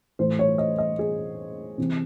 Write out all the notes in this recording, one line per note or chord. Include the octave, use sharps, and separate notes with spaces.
A2 E3 A3 C5
C#5
D#5
D#5
G#4
C3 E3 C4